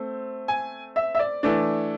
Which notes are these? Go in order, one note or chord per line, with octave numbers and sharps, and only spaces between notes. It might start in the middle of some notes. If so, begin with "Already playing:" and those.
Already playing: A3 C4
G#5
E5
E5
D5
E3 A3 D4